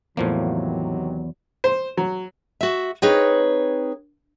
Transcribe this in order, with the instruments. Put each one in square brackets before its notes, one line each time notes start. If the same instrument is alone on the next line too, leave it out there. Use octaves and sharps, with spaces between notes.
[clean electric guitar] E2 [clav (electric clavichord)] A2 F3 A#3 [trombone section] C3 D#3 F#3
[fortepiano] C5
F#3
[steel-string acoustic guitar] F#4 E5
C4 D#4 G#4 B4 C#5